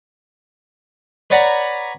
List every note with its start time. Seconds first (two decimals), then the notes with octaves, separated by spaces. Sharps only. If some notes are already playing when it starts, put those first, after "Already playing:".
1.30 B4 C#5 D5 F#5 A#5 B5